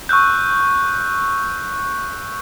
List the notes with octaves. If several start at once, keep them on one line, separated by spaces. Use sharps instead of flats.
C#6 E6 F#6 G6